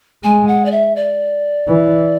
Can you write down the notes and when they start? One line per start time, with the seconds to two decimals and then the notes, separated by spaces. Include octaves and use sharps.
0.24 G#3 G#5
0.48 F#5
0.65 D5
0.72 E5
0.96 D5
1.68 E3